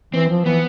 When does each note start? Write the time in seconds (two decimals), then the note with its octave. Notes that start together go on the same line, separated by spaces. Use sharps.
0.14 E3 C4
0.30 F3
0.45 E3 B3